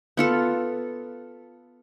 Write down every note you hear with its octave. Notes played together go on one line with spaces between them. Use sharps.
B3 F4 A4